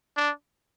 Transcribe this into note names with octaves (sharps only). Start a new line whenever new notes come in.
D4